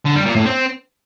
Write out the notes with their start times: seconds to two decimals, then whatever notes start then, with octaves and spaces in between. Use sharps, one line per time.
0.06 D3
0.16 G3
0.26 A#2
0.36 A2
0.46 C4